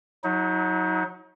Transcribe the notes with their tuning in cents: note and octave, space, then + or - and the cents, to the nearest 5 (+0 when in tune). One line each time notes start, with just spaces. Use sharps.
F#3 -15 D#4 +35